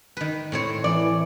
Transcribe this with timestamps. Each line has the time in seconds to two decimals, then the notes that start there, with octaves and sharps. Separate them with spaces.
0.17 D#3 B4
0.52 A2 C4 C#5
0.84 E3 D5